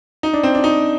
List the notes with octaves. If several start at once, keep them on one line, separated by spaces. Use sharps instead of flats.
D#4
D4
C4
D4
D#4